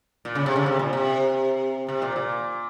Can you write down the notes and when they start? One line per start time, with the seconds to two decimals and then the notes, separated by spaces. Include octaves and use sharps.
0.25 A#2
0.35 C#3
0.46 C3
0.56 C#3
0.66 C3
0.79 A#2
0.93 C3
1.88 C3
2.02 A#2
2.16 A#2